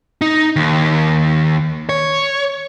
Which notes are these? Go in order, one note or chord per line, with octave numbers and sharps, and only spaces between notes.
D#4
D#2
C#5